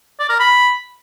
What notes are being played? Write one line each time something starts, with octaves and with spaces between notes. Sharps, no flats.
D5
A#4
B5